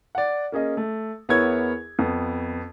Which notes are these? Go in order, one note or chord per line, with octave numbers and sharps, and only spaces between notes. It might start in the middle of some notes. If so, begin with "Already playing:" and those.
D5 F#5
A#3 C#4 G#4 D#5
A3
E2 B3 E4 A#4 C#5 G#6
F2 B3